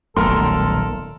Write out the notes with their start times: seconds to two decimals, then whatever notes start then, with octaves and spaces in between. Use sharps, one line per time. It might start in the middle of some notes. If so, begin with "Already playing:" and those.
0.17 D#1 B1 A3 A4 A#4 C6